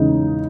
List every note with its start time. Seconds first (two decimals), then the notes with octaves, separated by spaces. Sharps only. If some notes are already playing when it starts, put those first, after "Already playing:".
Already playing: E2 C#3 G#3 D#4